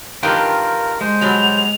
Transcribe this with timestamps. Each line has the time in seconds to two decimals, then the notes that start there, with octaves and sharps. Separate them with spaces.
0.23 D#3 D4 F4 G4 A#4 B4 G5
1.01 G#3 C5
1.21 B2 F#3 G3 F7